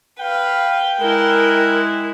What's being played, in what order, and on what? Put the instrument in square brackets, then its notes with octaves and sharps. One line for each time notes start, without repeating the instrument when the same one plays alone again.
[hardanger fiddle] B4 [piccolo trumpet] F5 [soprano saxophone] G5
[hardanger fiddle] G#3 E4 [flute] A#4 [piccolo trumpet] F#6